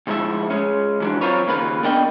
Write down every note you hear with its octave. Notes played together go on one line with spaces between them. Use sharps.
D2 G#2 F3 G#3 E4 E5
G#3 C#4
E3 F#3 D4
C4 F4 A#4 B4 C#5
D#2 C#3 A#3 F4 B4
B3 D4 A#4 D5 D#5 G5